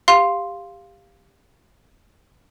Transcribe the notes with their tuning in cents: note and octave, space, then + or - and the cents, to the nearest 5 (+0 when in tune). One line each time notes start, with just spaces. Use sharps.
G4 +20 F5 +0 C6 +0